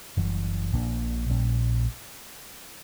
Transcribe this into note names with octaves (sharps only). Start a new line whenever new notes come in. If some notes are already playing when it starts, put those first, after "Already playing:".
F#1 F#2 E3 G3
A#1 A#2 A#3 D4
A#1 A#2 G3 C#4